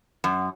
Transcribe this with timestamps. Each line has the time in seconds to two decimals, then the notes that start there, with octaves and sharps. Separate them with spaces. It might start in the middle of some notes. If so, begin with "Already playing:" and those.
0.24 F#2